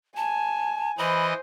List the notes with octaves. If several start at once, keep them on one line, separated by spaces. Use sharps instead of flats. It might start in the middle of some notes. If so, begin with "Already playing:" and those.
G#5 A5
E3 C5 D#5 B5